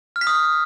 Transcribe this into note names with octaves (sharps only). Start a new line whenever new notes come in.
F6
B6
D#6